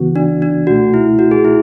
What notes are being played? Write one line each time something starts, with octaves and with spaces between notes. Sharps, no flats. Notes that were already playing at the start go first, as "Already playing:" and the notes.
Already playing: C#2 C#3 E3 B3 F#4
D4
D4
C#2 B2 A3 F#4
E4
F#4
G#4
E4